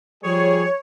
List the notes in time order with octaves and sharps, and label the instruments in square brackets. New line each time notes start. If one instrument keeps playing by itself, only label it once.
[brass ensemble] F3 G3 G#4 [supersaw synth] C#5